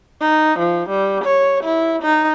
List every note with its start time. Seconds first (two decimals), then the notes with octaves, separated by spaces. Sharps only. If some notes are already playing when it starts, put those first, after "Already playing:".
0.20 D#4
0.59 F3
0.89 G3
1.24 C#5
1.64 E4
2.02 D#4